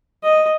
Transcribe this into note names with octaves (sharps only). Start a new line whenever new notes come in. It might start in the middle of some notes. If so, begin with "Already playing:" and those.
D#5